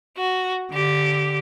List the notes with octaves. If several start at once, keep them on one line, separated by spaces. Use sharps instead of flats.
F#4
D3 G4